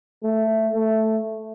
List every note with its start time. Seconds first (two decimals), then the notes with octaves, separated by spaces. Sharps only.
0.23 A3
0.74 A3